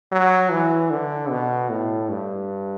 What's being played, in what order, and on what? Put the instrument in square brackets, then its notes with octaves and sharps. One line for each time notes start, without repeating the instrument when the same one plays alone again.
[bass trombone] F#3
E3
D3
B2
A2
G2